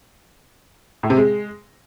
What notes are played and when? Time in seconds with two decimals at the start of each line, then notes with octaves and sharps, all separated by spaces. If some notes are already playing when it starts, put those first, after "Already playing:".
1.03 A2
1.10 C3
1.17 G#3